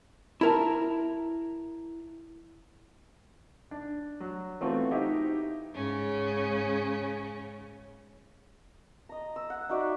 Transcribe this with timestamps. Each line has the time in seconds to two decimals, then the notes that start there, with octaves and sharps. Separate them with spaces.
0.41 E4 A#4 A5
3.71 D4
4.20 F#3
4.61 E3 A3 B3 C4 F4 F#4
4.91 D#4 E4 G4
5.74 G#2 C#3 C#4
9.09 D#5 A#5
9.36 E6
9.50 F#5
9.69 D#4 F#4 D5 E5